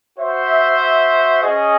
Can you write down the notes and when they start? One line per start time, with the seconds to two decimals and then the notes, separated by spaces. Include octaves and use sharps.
0.17 F#4 C5 E5
1.43 C#4 G#4 D#5